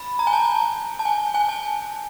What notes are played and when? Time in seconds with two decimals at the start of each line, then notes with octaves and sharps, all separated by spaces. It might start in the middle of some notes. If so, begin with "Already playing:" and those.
Already playing: B5
0.19 A#5
0.27 G#5
0.33 A5
0.99 A5
1.05 G#5
1.34 G#5
1.49 A5